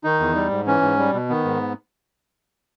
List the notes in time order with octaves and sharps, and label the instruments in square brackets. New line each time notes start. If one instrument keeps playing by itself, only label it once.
[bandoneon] D#3 D#4
E2
G3
G#2
E3 C#4
G#2
G3
B2
D#3 B3
G#2